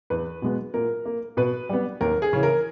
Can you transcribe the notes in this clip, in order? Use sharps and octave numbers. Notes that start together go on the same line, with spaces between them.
E2 B4
B2 G#3 B3
A#2 A#4
A#3
B2 B4
G3 B3
D#2 A#4
G#4
C#3 E3
A#4